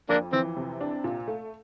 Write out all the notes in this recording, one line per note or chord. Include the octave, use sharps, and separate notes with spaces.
F2 A#3 D4
E3 C4
C3
D4
A#2
A3